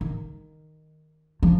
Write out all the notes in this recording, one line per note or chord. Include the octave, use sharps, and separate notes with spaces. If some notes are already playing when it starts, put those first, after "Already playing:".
D#3
F3